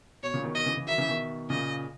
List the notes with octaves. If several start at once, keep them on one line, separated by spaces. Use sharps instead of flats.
B2 C#5
A#2 C#3
B2 D#3
B2 D#3 D#5
C#3 E3
C#3 E3
D#3 F#3 E5
C#3 E3
B2 D#3
A#2 C#3 D#5